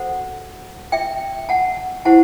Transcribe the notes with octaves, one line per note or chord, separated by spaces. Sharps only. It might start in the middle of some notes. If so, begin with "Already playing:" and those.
Already playing: F#4 A4 C5 F#5
E5 G5
F#5 A5
E4 G4 C5 F#5 A5